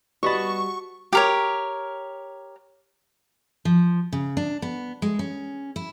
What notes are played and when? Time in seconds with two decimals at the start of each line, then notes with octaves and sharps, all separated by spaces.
0.23 G3 B3 F#4 D#5 A5 B5 C#6
1.13 G4 A#4 C#5
3.65 F3
4.13 C#3
4.37 D4
4.62 B3
5.02 G#3
5.19 C#4
5.76 E4